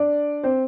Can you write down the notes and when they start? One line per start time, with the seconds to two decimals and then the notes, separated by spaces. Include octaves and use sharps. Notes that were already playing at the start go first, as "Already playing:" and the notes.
Already playing: D4 D5
0.43 C4 C5